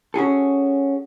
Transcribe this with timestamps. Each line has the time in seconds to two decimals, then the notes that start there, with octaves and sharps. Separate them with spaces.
0.14 C#4 F#4 G#4 A4